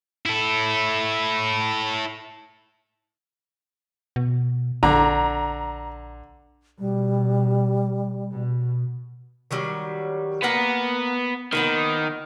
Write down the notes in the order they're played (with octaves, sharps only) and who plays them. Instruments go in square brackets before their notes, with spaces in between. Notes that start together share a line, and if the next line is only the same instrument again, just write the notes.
[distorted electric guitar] E4 A4
[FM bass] B2
[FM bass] A#1 [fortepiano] D3 [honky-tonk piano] A#5
[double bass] B2 [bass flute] G3
[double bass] B2
[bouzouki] D#3 F#3 G3
[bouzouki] A#3 F5 F#5 [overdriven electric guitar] B3
[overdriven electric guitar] D#3 [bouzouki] F3 A#3 B3